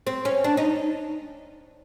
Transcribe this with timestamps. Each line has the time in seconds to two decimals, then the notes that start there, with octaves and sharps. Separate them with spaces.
0.07 C4
0.25 C#4
0.44 D4
0.57 D#4